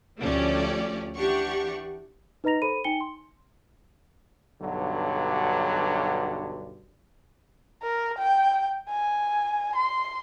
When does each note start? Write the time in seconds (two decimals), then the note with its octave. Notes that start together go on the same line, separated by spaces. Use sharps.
0.19 D2 F3 A3 C#4 G4 D5
1.16 E3 D4 G4 F#5 C#6
2.44 D#4 B4 D#5 A#5 A#6 F7
2.62 A4 C5 B5 D#7
2.84 D#4 G5 G#5 C#7 G7
3.01 C6
4.60 B1 G2 D3 F#3
7.83 A#4
8.18 G5
8.89 G#5
9.75 C6